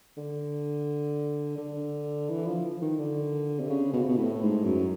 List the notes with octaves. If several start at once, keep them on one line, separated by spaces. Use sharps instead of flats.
D3
D3
E3
F3
D#3
D3
C3
C#3
B2
C3
B2
A2
G#2
F#2